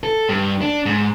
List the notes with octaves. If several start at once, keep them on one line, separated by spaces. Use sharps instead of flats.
A4
G2
D4
G#2